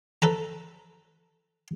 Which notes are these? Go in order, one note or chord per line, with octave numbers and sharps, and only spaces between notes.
A4 B4 A#5